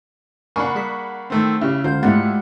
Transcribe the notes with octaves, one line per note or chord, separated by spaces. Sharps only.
A#3 D4 F#5 G#5 B5 C#6
G3 G#4 B6
D#3 A3 C4
C#3 E4 G4
C#2 D3 F4 C5 G6
G#2 G3 A3 E4 F#5 A6